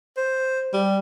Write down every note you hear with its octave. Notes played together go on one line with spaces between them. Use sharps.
C5
G3